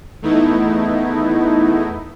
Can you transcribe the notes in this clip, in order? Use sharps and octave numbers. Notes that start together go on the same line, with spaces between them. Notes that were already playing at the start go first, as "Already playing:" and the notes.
E2 A3 B3 D#4 E4